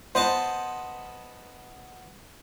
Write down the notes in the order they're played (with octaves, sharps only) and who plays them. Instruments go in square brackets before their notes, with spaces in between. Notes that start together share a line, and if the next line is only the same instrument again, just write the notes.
[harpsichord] B3 D#5 A5 [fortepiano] C5